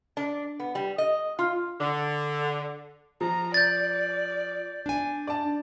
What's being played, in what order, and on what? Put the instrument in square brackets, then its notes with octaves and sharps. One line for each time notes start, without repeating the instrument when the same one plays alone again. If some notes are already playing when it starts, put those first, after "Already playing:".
[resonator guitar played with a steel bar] D4
B3
G3
D#5
F4
[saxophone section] D3
[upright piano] F3 [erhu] A#5
[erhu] D5 [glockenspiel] G6 A6
[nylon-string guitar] D4 G#5
[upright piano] D5 A5